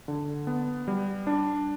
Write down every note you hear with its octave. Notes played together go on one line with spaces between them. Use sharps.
D3
B3
G3
D4